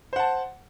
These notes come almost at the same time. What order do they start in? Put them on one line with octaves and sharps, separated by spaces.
C5 F#5 A5